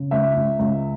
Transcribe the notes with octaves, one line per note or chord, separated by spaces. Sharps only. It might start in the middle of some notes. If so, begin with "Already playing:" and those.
Already playing: C#3
C#2 E5
C#2
C#2